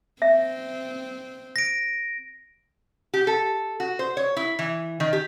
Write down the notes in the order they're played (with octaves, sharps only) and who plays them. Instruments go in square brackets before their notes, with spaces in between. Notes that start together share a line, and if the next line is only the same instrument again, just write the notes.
[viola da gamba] C4 [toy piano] E5
[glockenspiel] A#6 D7
[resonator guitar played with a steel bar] G4
A4
F#4
C5
C#5
E4
E3
D#3
G4